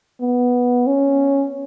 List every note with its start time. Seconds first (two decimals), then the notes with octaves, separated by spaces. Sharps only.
0.21 B3
0.87 C#4